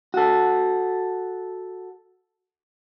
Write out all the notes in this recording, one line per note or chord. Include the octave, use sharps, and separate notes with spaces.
F#4 A4